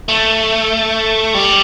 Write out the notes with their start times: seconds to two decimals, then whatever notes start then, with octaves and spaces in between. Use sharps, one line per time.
0.09 A3
1.34 G3